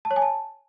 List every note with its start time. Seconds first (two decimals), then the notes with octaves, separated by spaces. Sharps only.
0.05 A5
0.11 C#5
0.16 G#5
0.22 A5